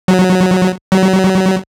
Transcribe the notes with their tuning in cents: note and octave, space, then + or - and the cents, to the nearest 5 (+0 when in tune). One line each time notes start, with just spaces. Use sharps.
F#3 -10
F#3 +30